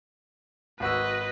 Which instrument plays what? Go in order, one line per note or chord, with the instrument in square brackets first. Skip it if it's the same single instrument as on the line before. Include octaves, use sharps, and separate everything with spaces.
[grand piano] G#1 F#4 E6 [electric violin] B4 D#5